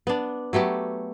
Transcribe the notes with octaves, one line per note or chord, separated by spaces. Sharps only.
B3 D4
F#3 A3 B3 G4